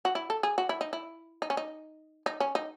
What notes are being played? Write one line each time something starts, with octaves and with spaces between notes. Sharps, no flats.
F#4
E4
A4
G#4
F#4
E4
D#4
E4
D#4
C#4
D#4
D#4
C#4
D#4